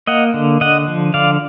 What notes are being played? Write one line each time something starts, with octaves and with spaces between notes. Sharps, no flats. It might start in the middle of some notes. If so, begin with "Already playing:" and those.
A#3 D#5 F#5
D3
D3 D#5 F#5
F3
D3 D5 F5